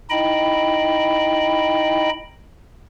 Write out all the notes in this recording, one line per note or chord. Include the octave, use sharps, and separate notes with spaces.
D#4 E4 D#5 G5 B5